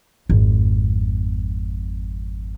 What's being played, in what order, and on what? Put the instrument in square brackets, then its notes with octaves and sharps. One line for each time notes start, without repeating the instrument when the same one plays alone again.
[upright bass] G#1 F2